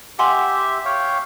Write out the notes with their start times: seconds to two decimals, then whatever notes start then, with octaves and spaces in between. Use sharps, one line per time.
0.19 G4 E5 F#5 G#5 C6
0.85 C#5 F5 G5